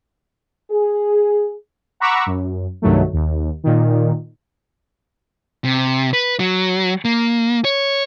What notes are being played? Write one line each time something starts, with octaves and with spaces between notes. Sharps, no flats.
G#4
F#5 A#5 B5 C#6 D6 E6
F#2
C2 G2 D#3 F#3 A3
D#2
A#2 D#3
C3
B4
F#3
A#3
C#5